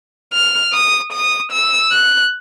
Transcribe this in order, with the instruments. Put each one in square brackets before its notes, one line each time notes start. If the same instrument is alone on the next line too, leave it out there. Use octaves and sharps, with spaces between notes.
[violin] F6
D#6
D#6
E6
F#6